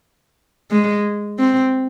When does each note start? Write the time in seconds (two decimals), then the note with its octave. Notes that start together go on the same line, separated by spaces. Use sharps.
0.71 G#3
1.39 C4